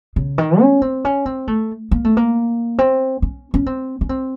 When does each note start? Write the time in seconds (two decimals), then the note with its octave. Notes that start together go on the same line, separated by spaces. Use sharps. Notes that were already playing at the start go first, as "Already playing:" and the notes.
0.16 C#3
0.38 D#3
0.60 C#4
0.82 C4
1.05 C#4
1.26 C4
1.47 A3
1.91 A#3
2.04 A3
2.17 A#3
2.79 C4
3.22 C#4
3.54 C#4
3.66 C4
4.01 C#4
4.09 C4